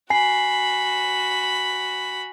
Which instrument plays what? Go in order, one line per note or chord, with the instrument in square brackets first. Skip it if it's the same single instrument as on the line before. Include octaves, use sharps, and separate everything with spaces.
[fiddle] F#4 B5 [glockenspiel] G#5 C7